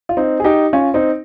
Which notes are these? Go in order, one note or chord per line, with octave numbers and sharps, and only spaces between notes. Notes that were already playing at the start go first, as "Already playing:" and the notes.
F4
C4 D#4
G#4
D#4 G4
C#4 F4
C4 D#4